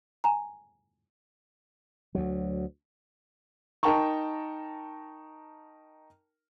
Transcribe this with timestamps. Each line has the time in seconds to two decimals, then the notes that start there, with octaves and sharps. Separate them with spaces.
0.24 G#5 A#5
2.15 D2 F#3
3.83 D#4 A#4 G5 A5 A#5 C#6